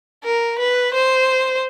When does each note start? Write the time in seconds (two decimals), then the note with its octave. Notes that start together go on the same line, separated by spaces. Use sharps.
0.24 A#4
0.59 B4
0.93 C5